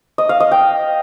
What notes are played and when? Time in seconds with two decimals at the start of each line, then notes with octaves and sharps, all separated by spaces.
0.18 D#5
0.29 F5
0.40 D#5
0.52 G5